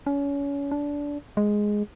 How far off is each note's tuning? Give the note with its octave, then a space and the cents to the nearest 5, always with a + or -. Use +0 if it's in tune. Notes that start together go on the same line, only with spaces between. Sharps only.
C#4 +30
D4 -20
G#3 +0